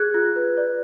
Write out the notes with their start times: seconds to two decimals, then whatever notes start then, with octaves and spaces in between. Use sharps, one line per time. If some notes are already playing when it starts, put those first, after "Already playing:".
Already playing: G#4 F#6 G#6
0.14 F4
0.36 B4
0.57 D5